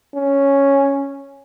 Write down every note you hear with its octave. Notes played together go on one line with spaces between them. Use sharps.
C#4